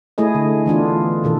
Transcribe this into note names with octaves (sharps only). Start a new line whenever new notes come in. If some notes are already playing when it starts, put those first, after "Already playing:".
A3 E4 G#4 D#5
D3
E3 B3 D4 F4
B2 D#3 A4